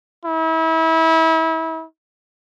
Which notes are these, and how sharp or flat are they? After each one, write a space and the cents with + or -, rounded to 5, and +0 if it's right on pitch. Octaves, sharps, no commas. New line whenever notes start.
E4 -30